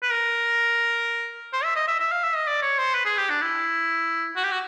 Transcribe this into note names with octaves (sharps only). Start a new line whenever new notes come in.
B4
A#4
C5
E5
D#5
E5
E5
F5
E5
D#5
D5
C#5
C5
B4
G#4
G4
D4
E4
F#4
G4
F#4